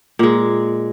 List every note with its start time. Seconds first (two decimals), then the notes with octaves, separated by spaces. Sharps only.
0.19 A#2 G#3